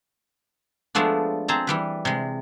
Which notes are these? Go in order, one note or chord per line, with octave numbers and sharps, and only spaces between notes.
F3 G#3 A3 B3 D4
C4 G#4 C5 A5 A#5
E3 G3 B4
C3 G#3